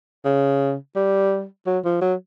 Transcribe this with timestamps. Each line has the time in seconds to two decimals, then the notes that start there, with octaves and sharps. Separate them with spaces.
0.25 C#3
0.96 G3
1.66 F#3
1.84 F3
2.02 F#3